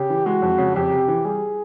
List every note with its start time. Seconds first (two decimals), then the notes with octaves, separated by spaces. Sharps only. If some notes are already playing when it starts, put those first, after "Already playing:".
Already playing: C#3 G4
0.10 E3
0.26 G#3 F#4
0.42 F2
0.58 C#3
0.76 F2 G4
0.91 C3
1.08 E3
1.25 G3 G#4